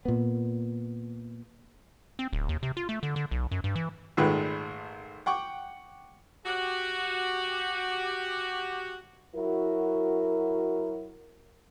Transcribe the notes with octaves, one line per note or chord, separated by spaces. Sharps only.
A#2 B3
C4
D1
D#2
C3
F4
A3
D3
D3
B1
F#2
G2
E3
G#1 A#2 D#3 G#3 A3 B4
F#5 G5 C#6 D6
F#4 G4
F#3 E4 F#4 A#4